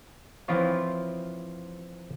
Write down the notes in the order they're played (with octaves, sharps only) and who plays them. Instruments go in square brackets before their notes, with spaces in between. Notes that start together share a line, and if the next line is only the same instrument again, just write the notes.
[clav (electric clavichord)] E3 F3 C4 E4 F4 C#5